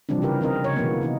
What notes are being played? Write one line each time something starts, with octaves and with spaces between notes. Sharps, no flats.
C3 E3 F3 G3 C4 D4
C#3 G4 A#4 B4
D#3 C4 D#4 A#4 D#5
C#3 C#5
B2 D#3 E3 F#3 A#3 B3
C3 D#3 D#4